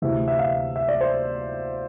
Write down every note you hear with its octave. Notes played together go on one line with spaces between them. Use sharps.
D2 C3 E3 E5
E5
F5
E5
D5
C5